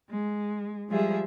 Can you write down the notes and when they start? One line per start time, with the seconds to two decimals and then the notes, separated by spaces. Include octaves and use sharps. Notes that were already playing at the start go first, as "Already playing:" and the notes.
0.11 G#3
0.90 F3 G3 G#3 G4 G#4 E5